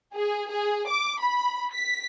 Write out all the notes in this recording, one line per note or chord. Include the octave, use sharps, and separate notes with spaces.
G#4
G#4
D6
B5
B6